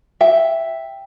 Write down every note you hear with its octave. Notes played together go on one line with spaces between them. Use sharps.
E5 G5